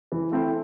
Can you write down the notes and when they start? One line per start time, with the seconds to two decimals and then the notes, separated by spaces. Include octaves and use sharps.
0.12 E3
0.31 A3 C4 E4